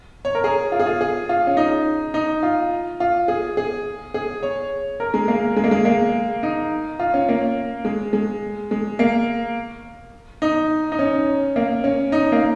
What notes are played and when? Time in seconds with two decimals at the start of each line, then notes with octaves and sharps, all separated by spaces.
0.25 C#5
0.35 A#4
0.44 G#4
0.72 F4
0.80 G#4
0.86 F4
1.01 G#4
1.29 F4
1.47 C#4
1.57 D#4
2.14 D#4
2.43 F4
3.00 F4
3.28 G#4
3.57 G#4
4.14 G#4
4.43 C#5
5.00 A#4
5.14 G#3
5.28 A#3
5.56 G#3
5.64 A#3
5.71 G#3
5.85 A#3
6.43 D#4
6.99 F4
7.14 C#4
7.29 A#3
7.85 G#3
8.13 G#3
8.71 G#3
8.99 A#3
10.42 D#4
10.92 D#4
10.99 C#4
11.56 A#3
11.84 C#4
12.12 D#4
12.32 A#3